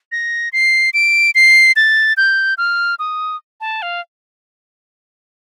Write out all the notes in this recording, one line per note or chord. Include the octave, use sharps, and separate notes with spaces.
A#6
C7
D7
C7
A6
G6
F6
D#6
A5
F5